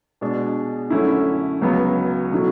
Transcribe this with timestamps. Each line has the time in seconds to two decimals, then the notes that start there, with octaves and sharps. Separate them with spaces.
0.21 B2 G#3 D4
0.90 F#2 D3 A3 C#4 E4
1.61 C#2 C#3 F#3 B3 F#4
2.32 B2 F#3 A3 E4